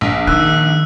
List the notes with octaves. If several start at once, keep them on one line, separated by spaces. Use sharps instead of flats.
A#1
D#3 E6 F#6